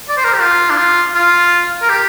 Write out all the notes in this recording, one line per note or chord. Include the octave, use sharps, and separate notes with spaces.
D5
C5
A#4
G4
F4
D4
F4
F4
A#4
G4